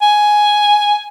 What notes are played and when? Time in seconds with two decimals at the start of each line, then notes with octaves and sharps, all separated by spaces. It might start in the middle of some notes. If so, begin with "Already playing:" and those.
0.02 G#5